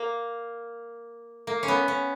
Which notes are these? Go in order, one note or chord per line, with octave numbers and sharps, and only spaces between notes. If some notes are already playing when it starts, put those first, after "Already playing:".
Already playing: A#3
A#3
C#4
B3
C#4